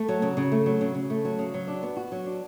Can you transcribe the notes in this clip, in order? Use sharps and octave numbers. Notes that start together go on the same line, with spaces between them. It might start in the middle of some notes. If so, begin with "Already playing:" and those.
Already playing: A3
F#3
C#3
C#3
A3
F#3
C#3
C#3
A3
F#3
C#3
F#3
D4
B3
F#4
F#3
D4